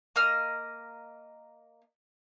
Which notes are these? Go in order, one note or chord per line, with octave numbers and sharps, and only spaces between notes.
A#3 D#5 F6